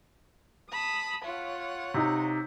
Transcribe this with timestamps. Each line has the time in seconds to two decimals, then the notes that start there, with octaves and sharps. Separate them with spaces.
0.70 A5 B5 D#6
1.24 F4 C#5 F#5
1.94 C3 D#4